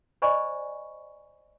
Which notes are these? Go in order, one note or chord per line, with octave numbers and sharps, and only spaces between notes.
C5 D5 D#5 G#5 B5 C#6